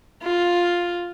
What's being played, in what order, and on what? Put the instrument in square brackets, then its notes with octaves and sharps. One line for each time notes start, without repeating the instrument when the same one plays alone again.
[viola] F4